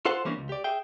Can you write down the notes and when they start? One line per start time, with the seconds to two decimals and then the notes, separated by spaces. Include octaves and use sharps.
0.05 F4 A4 C5 F#5 A5 C6
0.25 E3 G3 A#3 C#4 D4
0.38 C#2
0.49 G4 D5
0.64 G#4 E5 G5